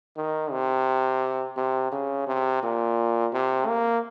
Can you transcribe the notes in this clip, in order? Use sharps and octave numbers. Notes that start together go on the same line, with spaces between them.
D#3
C3
C3
C#3
C3
A#2
C3
A#3